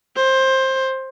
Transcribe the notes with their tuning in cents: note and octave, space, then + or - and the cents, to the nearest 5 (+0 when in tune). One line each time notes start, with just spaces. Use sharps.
C5 +15